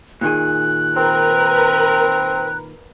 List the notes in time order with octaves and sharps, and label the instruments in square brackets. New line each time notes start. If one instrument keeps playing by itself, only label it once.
[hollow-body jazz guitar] A#2 D#3 G#4 [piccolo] F#6
[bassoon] C4 [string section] A#4 B4